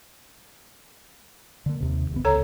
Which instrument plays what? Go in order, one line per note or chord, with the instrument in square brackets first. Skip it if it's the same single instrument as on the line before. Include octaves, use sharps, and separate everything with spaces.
[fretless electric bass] D3 A#3
D#2 C3
D1 G1 B3
[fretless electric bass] C#2 [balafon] A4 C#5 A#5